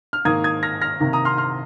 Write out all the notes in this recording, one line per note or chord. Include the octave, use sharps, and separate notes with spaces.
F6
G#2 D#3 A#3 D#6 G#6
D#6 G#6
F6 A#6
F6 A#6
C3 D#3 A#3
A#5 D#6
C6 F6
C6 F6